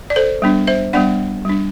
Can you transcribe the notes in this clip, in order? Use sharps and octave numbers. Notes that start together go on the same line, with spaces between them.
D5
A4 C5
G3 B3 D4
C5 E5
G3 B3 D4 D5 F#5
G3 D4